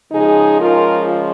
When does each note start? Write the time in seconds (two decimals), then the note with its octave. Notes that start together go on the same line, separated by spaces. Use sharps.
0.11 C#3 F3 G#3 D#4 G#4
0.60 F4 A#4